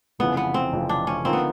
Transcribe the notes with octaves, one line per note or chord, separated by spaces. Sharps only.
F1 F2 C#3 E3 B3
B3
C4
F1 F2 C#3 E3
D4
C#4
D3 F3 A#3 C4 D#4
B3